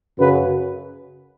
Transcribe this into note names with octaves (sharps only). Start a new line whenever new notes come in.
F#2 C#3 F#3 B4